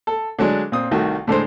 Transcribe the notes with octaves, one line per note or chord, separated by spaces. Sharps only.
A4
D3 F#3 G#3 D4
A#2 C4 D#6
C2 D#3 A3 F#4
A2 D3 G#3 C5